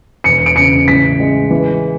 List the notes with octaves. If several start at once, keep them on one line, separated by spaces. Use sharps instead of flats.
E1 C#7
D7
C#3 C#7
A1 B6
G#3
E3